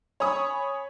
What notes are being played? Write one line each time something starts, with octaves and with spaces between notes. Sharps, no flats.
C#5 G#5 B5 C#6 D#6